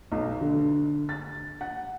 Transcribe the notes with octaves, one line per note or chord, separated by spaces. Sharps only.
B1
D3
A6
F#5